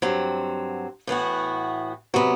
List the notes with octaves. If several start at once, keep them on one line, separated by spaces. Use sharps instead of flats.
G2 F#3 C4
A2 E3 B3 F#4
C3 F#3 B3